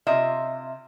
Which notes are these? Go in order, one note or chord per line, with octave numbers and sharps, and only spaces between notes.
C3 F4 D#5 E5